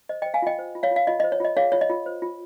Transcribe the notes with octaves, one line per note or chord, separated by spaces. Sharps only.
C5 D#5
D#5 G5
C5
F5 G#5
F4 D#5 G5
C5
F4
C#5 F5
F4
F5
F4 D#5
D#5
C5
C#5
F4 D#5
G#4 C#5 F5
F4 C#5
D#5
F4
C5
F4